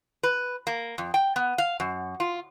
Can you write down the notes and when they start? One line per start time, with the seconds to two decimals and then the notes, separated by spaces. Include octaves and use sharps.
0.23 B4
0.67 A#3
0.98 F2
1.14 G5
1.36 B3
1.58 F5
1.80 F#2
2.20 F4